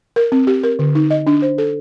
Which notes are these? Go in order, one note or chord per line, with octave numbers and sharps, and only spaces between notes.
A#4
C4
G4
A#4
D3
D#4
D#5
D4
C5
A4